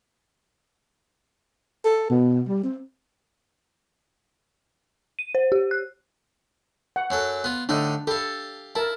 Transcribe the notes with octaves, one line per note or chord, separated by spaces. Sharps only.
A4
B2
G3
C4
D#7
C5
G4
F#6
F#5
F#2 F#3 A4
B3 F4
A2 D3 D4 D#4
G4 A4 F5
E4 A#4 A5